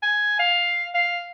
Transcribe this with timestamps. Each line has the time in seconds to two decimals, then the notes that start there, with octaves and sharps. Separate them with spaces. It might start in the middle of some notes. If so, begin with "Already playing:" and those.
0.02 G#5
0.39 F5
0.95 F5